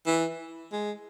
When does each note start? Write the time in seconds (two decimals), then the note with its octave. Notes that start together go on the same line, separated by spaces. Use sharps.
0.06 E3
0.72 G#3